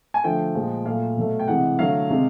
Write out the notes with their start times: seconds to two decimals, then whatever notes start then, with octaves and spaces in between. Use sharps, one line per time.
0.14 G#5
0.24 D3 F3 A3 G5
0.55 A#2 F3 G#3
0.86 A#2 F#3 A3 F5
1.17 B2 F#3 A3
1.40 G5
1.48 C3 E3 G#3 F#5
1.79 D3 F#3 A3 F5
2.10 C3 D#3 G#3